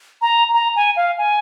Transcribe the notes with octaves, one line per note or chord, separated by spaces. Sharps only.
A#5
A#5
G#5
F5
G#5